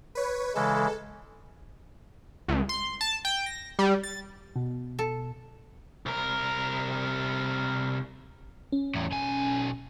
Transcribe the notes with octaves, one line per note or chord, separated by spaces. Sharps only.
B4 C#5
C#3 E3 G#3 A4
C#2
C6
A5
G5
A#6
G3
A6
B2
A4
C2 A#4
C#4
E2 A2
B1 G#5